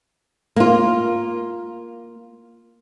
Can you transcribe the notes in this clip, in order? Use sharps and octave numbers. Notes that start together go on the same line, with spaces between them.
A#3 F4